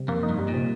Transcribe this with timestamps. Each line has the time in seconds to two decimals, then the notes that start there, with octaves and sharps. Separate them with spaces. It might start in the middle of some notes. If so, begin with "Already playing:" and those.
Already playing: C3 G3
0.08 F2 A#3
0.23 D#4
0.29 G2
0.39 G3
0.48 A#2
0.54 C3